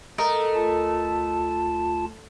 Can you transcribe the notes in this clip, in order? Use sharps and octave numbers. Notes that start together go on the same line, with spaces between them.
A3 A#4 D#5
D2 F4 A5